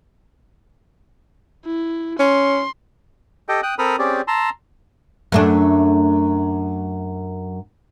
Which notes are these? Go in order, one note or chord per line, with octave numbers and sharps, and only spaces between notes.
E4
C#4 C6
G4 A4 D#5 G5
G5 D#6 F#6
C4 A4 A#4 B5 D#6 F6
C4 C#4 G4 G#4 D5
A5 A#5 C6 E6
F#2 A3 D4